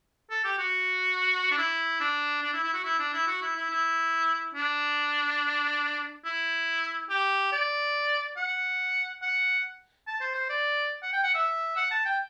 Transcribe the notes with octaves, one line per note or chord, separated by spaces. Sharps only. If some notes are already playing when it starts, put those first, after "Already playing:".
A4
G4
F#4
D4
E4
D4
D4
E4
E4
F#4
E4
D4
E4
F#4
E4
E4
E4
D4
E4
G4
D5
F#5
F#5
A5
C5
C5
D5
F#5
G5
F#5
E5
F#5
A5
G5